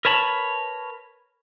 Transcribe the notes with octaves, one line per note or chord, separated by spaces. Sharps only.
A#4 B4 C#5 A5 B5